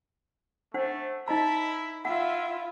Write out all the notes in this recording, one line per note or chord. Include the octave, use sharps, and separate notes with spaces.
A3 D4 C5 F#5
D#4 E4 D#5 A#5 B5
E4 F4 E5 F#5